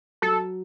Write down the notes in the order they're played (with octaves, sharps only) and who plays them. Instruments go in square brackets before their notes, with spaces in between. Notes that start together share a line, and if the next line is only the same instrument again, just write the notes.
[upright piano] F#3 [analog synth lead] A4